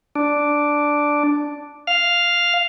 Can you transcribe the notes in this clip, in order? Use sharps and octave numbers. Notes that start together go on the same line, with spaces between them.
D4
F5